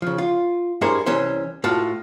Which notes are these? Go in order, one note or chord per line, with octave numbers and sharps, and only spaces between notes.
C#3 F3
F4
G2 E4 G#4 A#4 C5 C#5
C2 E3 C#4 C5
A2 F4 F#4 A5